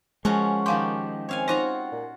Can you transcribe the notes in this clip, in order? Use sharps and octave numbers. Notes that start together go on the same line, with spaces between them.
F3 G#3 C#4 F#4 A#4 G#5 C#6
D#3 F3 G4 F5 C6
C4 C#5 F5 G#5
D#4 F4 F#4 C5 A#5
A#2